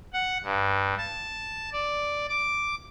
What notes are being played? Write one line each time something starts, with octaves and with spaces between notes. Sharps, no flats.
F#5
G2
A5
D5
D6